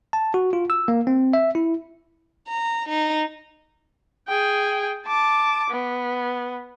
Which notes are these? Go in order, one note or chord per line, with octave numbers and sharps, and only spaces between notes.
A5
F#4
F4
E6
A#3
C4
E5
E4
A#5
D#4
G#4 G5
A5 D6
B3